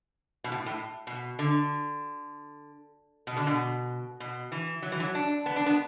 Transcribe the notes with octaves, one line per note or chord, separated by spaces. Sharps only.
B2
A2
A2
B2
D3
B2
D3
B2
B2
E3
F#3
E3
F#3
D4
B3
D4
B3